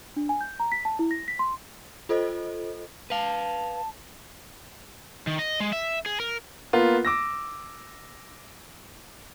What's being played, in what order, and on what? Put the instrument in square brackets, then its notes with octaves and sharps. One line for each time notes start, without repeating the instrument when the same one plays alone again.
[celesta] D4
G#5
G6
A#5
B6
A5
E4
A#6
B6
C6
[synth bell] F4 A4 C5 D#5
[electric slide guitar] B4 F5 [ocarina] A5
[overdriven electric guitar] D#3
D#5
G#3
E5
G#4
A#4
[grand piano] A#3 B3 F4
D6 E6 A#6